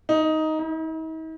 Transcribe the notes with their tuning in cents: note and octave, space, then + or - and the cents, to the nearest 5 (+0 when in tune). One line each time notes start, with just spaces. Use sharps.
D#4 +10
D#4 +45